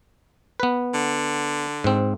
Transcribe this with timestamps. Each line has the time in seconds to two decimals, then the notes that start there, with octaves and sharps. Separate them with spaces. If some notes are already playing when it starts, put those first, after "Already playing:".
0.60 B3 B4
0.94 D3
1.84 G#2 C4